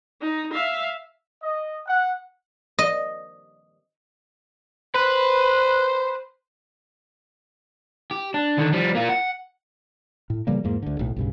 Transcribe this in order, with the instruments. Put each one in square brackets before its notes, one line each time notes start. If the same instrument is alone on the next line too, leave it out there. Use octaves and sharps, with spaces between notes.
[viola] D#4
E5 F5
[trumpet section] D#5
F#5
[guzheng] D#5
[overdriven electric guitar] B4 [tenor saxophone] C5
[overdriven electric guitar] G4
D4
D3 D#3
F3 G3
A#3 F4
F#5
[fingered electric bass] A2
C#3 E3 G3 A#3
E2 G#2 A#3
D2 D3
B1 A2
B1 G2 C#3